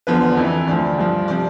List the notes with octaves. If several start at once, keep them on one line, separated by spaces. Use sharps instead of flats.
E2 D3 F3 B4
F2 E3
D2 D3 F3 D5
G2 F3
C3 F3 D5